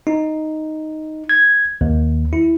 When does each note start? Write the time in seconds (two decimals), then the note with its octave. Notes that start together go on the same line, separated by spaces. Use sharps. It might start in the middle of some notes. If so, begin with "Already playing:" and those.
0.07 D#4
1.29 G#6
1.81 D#2
2.33 E4